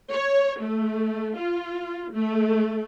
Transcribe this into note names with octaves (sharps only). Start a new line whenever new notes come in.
C#5
A3
F4
A3